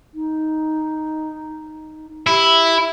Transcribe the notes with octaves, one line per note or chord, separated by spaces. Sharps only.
D#4
E4 G4